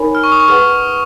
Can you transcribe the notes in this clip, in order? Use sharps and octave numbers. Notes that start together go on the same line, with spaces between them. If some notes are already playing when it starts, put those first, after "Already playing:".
Already playing: D#4 A#4 C#5 G#5 B5
F6
C#6
D#6
C#6
G#4 B4 F#5 F6